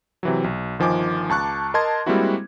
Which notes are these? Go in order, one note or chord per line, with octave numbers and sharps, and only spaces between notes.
C3 E3 F#3
B1
G1 D#3 F3 D#5 G#5 D6
C#2 A5 C#6 F#6
A#4 D#5 A5 C6 G#6
G3 G#3 A#3 C4 E4 F#4